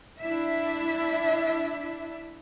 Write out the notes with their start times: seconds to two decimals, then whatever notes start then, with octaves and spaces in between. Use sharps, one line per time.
0.21 D4 E4 E5